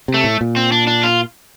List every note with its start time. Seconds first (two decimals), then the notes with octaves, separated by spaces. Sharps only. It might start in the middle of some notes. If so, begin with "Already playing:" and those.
0.08 C3
0.14 A3
0.24 A2
0.41 A#2
0.56 C4
0.72 D4
0.87 D4
1.03 F4